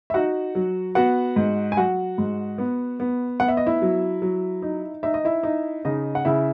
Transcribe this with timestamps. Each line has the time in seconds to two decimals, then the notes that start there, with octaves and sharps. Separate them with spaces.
0.10 E5
0.14 D#4 F#4 F#5
0.55 F#3
0.95 B3 F#4 F#5
1.36 G#2
1.72 G#5
1.77 F#3 F#4 F#5
2.18 G#2
2.58 B3
3.00 B3
3.40 B3 F#5
3.48 E5
3.57 D#5
3.67 E4 E5
3.82 F#3
4.22 F#3
4.62 D#4
5.03 D#4 E5
5.14 D#5
5.25 E4 E5
5.43 D#4
5.85 C#3 D#4 D#5
6.15 F#5
6.25 C#3 E4 E5